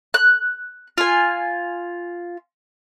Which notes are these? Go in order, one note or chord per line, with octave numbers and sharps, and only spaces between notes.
F#6
F4 G#5